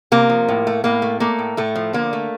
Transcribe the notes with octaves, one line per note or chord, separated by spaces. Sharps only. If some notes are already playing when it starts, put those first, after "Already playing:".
C3 A#3
F3
A2
A3
A2 A#3
A3
A3 A#3
A2
A2 A3
F3
D3 A#3
A3